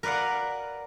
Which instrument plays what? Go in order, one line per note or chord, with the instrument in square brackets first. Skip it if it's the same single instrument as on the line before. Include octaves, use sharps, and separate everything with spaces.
[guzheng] A#4 B4 D5 F5 F#5